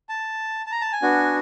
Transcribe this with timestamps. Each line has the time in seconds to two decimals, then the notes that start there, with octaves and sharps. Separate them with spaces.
0.09 A5
0.66 A5
0.71 A#5
0.81 A5
0.92 G#5
1.02 B3 D4 F#4